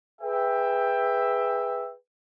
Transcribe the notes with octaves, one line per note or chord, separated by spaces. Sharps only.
G#4 B4 E5 G5